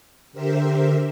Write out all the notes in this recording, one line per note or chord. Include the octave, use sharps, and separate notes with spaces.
D3 G4 A#4 C5 E5